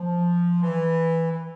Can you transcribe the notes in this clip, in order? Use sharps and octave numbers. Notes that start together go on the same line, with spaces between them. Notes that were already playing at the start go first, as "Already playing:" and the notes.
Already playing: F3
E3
E3